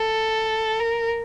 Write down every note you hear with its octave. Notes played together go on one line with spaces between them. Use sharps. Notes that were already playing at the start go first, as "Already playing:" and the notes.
Already playing: A4
A#4